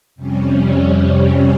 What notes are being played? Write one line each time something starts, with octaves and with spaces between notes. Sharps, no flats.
F2 C3 G3 C#4